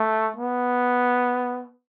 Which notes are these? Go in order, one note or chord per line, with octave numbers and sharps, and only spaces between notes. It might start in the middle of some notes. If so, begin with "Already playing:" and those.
Already playing: A3
B3